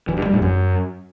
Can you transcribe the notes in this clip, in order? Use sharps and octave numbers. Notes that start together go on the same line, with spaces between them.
E3
G2
G3
A2
F#2